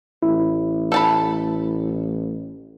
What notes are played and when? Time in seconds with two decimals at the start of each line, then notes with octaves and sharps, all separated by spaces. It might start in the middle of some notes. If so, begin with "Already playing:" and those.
0.23 A1 E4
0.92 A4 A5 B5